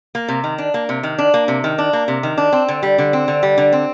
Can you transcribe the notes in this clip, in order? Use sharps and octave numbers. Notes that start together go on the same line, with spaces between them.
A#3
C3
D#3
D4
A#3
C3
D#3
D4
A#3
C3
D#3
D4
A#3
C3
D#3
D4
C4
D3
G3
D3
C4
D3
G3
D3
C4